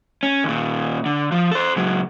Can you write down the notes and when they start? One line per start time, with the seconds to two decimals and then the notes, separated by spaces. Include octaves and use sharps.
0.23 C#4
0.44 D#2 A#2
1.06 D3
1.32 F3
1.51 A4 C5
1.76 C#2 F#3